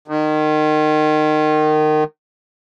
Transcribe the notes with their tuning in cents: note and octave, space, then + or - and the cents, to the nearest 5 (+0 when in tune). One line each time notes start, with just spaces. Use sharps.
D#3 -25